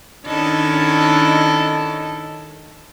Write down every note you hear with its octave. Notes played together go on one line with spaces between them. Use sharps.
D#3 C#4 D4 E4 A4 D#5